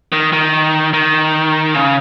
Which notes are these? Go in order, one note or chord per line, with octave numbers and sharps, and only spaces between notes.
D#3
D#3
D#3
C#3